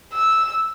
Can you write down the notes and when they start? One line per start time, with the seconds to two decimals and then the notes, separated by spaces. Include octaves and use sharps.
0.14 E6